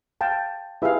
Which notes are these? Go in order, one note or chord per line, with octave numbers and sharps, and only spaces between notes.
F5 G5 A5
E4 G4 G#4 B4 E5 F5